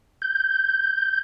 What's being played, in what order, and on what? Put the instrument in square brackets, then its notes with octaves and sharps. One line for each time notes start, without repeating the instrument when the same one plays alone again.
[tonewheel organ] G6